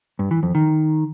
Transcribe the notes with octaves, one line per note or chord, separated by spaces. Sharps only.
G2
E3
F2
D#3